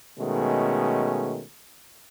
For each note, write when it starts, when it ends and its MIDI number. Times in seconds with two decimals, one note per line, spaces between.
0.19 1.43 47
0.19 1.43 51
0.19 1.43 56
0.19 1.43 57
0.19 1.43 61